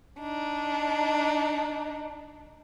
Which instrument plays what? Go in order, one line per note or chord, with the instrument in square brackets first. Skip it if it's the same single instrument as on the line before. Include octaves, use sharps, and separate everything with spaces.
[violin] D4 D#4